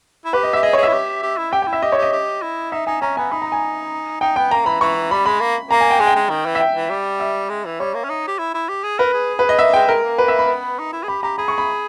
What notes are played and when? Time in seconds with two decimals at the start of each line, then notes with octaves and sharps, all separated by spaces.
0.25 E4
0.33 G4 B4
0.43 D#5
0.53 G4 E5
0.63 G#4 D#5
0.73 C#5
0.78 G#4
0.83 E4 E5
0.93 G4
1.22 G4
1.37 E4
1.52 G4 G5
1.62 G5
1.67 E4
1.73 E5
1.82 G4 D#5
1.92 C#5
1.98 G4 D#5
2.12 G4
2.42 E4
2.72 D#4 E5
2.87 D#4 G#5
3.01 C#4 A#5
3.17 B3 G#5
3.32 D#4 B5
3.42 A#5
3.52 G#5
4.21 D#4 G5
4.36 B3 G5
4.51 A#3 A#5
4.66 E3 B5
4.81 E3 C#6
5.11 G3 B5
5.26 G#3 B5
5.41 A#3
5.71 A#3 A#5
5.81 G#5
5.91 G5
5.99 G#3 G#5
6.07 G5
6.15 G#3
6.30 D#3
6.46 E3
6.55 E5
6.60 G5
6.75 E3
6.90 G3
7.20 E5
7.49 G#3
7.65 E3
7.80 G3 C#5
7.94 A#3
8.04 C#4
8.09 D#4
8.27 G4
8.39 E4
8.54 E4
8.69 G4
8.84 G#4
8.99 A#4 B4
9.14 G#4
9.39 B4
9.49 D#5
9.59 A#3 E5
9.73 G#3 G5
9.88 G#3 A#4
10.04 A#3
10.18 B4
10.28 E5
10.39 B5
10.48 B3
10.79 D#4
10.93 E4
11.03 G#4
11.08 G4 B5
11.23 G4 A#5
11.38 G#4 B5
11.48 C#6
11.58 B5